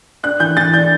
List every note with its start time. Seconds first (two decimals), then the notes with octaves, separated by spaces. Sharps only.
0.23 D4 F#6
0.40 E3 G6
0.57 E3 A6
0.73 D4 G6